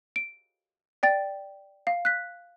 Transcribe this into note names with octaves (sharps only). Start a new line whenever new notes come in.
D7
D5 G5 A6
F5
F#6 B6